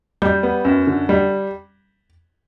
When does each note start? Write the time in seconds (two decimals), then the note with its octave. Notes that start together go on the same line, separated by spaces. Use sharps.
0.22 G3 G6
0.43 B3
0.65 F#2
0.87 D3
1.09 G3